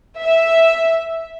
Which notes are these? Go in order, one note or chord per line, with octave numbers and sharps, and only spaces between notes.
E5